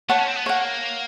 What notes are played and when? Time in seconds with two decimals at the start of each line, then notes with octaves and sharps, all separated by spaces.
0.09 A3 C#5 F#5 A5
0.18 C#4
0.28 C4
0.37 B3
0.46 A#3 C#5 F#5